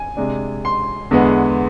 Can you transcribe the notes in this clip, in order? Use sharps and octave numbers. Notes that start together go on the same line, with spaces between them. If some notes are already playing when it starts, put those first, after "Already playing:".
Already playing: G#5
C3 G#3 D4
C6
E2 D3 G#3 B3